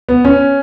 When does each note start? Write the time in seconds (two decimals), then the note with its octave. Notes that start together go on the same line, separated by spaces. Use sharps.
0.09 B3
0.25 C#4